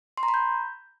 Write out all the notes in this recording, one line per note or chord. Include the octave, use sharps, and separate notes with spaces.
C6
A#5
B5
G6